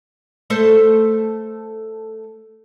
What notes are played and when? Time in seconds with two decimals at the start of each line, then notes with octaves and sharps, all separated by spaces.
0.50 A3 A4 C5